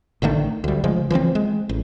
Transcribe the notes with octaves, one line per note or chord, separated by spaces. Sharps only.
A1 D3 D#3 A3
D2 G3
C#3 F3 G#3
E3 F3 A3 C4
G#3
A1